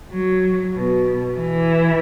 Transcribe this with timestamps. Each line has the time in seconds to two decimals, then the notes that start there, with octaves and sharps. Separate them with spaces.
0.12 F#3
0.75 B2
1.38 E3